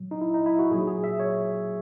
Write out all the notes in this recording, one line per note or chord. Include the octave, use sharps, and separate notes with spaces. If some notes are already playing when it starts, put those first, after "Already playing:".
Already playing: A#2 F#3
D#4
E4
D#4
E4
F#4
A#2 F#3 G#4
G#4
E5
C#5